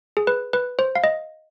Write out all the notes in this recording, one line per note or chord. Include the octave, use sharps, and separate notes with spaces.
G#4
B4
B4
C5
F5
D#5